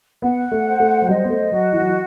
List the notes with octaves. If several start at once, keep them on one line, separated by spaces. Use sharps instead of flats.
B3 F#5
A3
C5
A3
F#3
G3 D#5
B3
A3
F#3 F#4
E3
F#3
E3